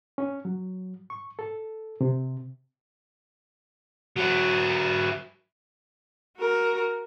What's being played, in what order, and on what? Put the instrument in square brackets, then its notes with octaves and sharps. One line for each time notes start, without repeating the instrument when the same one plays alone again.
[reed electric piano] C#4
F#3
C#6
A4
C3
[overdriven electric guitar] F#3 E4
[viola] F#4 A#4